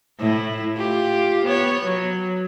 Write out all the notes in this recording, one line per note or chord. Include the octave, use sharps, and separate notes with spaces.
A2 E4
F4 G4
B3 C#5
F#3